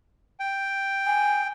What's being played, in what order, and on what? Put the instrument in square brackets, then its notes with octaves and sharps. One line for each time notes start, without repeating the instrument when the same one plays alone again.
[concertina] G5
[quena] G#5